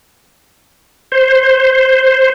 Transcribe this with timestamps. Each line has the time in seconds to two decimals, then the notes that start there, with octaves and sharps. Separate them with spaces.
1.12 C5